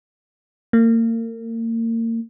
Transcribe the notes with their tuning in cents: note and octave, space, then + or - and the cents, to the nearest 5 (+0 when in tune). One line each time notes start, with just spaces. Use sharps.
A#3 -35